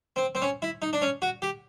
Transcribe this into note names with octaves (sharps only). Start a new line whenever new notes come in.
C4
C4
C#4
E4
D#4
D4
C#4
F#4
G4